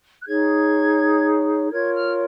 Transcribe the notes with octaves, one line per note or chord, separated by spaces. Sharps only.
F#6
D#4 G#4 C#5 G#6
F4 A#4 C#5 G#6
F6